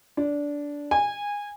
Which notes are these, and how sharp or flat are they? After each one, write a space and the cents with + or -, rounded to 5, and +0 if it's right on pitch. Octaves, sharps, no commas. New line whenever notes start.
D4 -15
G#5 -20